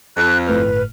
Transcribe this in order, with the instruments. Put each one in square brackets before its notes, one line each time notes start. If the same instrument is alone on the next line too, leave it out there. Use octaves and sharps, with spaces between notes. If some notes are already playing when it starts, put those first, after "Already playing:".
[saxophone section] F2 [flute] F#6
[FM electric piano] G1 A2 F6 [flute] B4